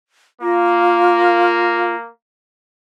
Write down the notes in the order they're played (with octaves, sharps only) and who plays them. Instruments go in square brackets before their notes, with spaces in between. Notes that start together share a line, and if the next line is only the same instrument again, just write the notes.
[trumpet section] A#3 [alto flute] F4